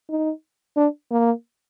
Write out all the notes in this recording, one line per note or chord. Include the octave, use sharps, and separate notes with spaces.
D#4
D4
A#3